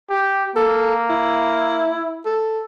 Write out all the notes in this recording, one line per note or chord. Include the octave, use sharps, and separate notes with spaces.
G4
A#3 A4
E4
A4